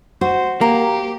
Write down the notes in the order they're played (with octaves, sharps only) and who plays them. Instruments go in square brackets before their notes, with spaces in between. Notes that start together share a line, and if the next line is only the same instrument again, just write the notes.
[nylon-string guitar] F#4 [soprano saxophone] C5
[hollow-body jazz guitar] A#3 [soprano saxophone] G4 [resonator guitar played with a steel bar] A#5